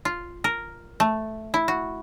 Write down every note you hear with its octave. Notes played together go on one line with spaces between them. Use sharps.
F4
A#4
A3
E4
F#4